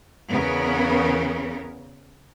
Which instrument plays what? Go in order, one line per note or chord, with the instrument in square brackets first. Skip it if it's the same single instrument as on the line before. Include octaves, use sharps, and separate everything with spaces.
[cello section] E2 C#3 B3 A#4